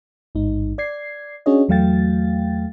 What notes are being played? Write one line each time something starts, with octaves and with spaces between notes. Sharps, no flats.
A1 G#2 D#4
D5 G#6 C7
C#4 D4 F#4 G#4 C#5 D#5
E2 F#3 A3 F5 G5 A6